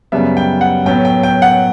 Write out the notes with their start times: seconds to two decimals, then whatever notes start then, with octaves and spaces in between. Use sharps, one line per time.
0.12 F#2 C#3 G3 B3 E5
0.37 G5
0.61 F#5
0.86 A2 F#3 B3 G5
1.05 G5
1.23 G5
1.42 F#5